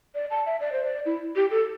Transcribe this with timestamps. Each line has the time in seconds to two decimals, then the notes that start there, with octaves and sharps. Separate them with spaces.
0.15 D5
0.30 A5
0.46 E5
0.61 D5
0.72 C5
0.85 D5
1.06 E4
1.36 G4
1.51 A4